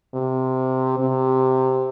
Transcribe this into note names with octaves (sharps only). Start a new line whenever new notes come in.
C3
C3